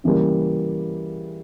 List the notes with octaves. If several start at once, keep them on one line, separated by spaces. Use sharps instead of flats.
C#3 E3 G3 A#3